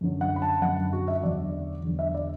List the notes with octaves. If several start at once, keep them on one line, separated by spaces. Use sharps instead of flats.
F#2 D3 F#3
F#5
B5
A5
F#2 D3 F#3 F#5
F#4
E5
E2 D3 F#3 D5
E2 D3 F#3
E5
D5